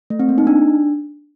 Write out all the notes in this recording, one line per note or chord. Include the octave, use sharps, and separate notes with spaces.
A3
C4
A#3
D#4
D4